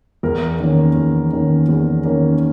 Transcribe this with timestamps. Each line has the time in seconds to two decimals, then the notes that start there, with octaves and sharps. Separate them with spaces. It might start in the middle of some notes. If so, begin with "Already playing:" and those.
0.23 E2 A#4
0.60 D#3 A#3 C#4
0.96 E2
1.32 D#3 A#3 C#4
1.69 E2
2.05 D#3 A#3 C#4